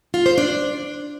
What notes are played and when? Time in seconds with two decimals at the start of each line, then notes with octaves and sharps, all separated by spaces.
0.14 F4
0.26 C5
0.38 D4